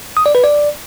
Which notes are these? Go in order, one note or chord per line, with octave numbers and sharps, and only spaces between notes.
D#6
D5
B4
D5